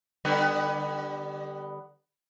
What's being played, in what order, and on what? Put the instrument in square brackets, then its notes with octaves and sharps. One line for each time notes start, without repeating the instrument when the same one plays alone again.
[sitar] D3 G3 B3